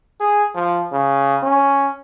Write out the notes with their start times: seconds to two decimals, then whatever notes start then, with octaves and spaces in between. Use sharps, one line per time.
0.20 G#4
0.55 F3
0.92 C#3
1.42 C#4